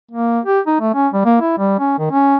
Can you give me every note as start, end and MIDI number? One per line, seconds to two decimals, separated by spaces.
0.11 0.40 58
0.45 0.60 67
0.67 0.76 63
0.81 0.94 57
0.95 1.08 61
1.13 1.24 55
1.25 1.38 58
1.41 1.55 64
1.58 1.78 55
1.79 1.99 61
1.99 2.11 51
2.11 2.37 61